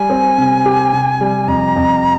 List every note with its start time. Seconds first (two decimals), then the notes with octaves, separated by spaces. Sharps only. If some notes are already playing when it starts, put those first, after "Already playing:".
Already playing: G3 G#5
0.10 C4
0.38 C3
0.65 G4
0.93 C3
1.21 G3
1.48 F2 A#5
1.76 F2